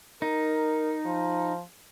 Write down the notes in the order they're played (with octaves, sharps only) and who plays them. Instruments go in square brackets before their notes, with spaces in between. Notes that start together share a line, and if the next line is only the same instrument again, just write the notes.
[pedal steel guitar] D#4 [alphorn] A#4
[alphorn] F3